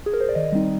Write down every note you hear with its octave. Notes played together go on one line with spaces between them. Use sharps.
G#4
A#4
C5
D5
D#3 D#5
G3 C4 D#4